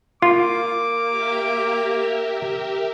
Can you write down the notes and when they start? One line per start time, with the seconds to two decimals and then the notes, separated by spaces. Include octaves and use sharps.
0.22 A#3 F4 D6
1.08 G4 A#4 E5